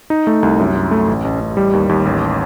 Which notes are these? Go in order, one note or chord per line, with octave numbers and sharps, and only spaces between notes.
D#4
A3
C2
F#2
F#2
A3
A1
A1
A1
G3
D#2
D#2
A1